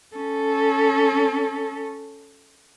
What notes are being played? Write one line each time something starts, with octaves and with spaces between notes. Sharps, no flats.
C#4 A4